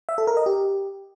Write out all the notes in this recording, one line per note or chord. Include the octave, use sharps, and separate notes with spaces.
E5
A4
A#4
D#5
G4